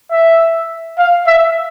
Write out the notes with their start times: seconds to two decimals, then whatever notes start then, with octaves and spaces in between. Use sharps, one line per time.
0.11 E5
0.98 F5
1.26 E5